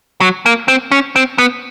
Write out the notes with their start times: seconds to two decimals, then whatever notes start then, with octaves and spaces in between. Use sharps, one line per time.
0.21 F#3
0.46 A#3
0.68 C4
0.91 C#4
1.16 C4
1.38 B3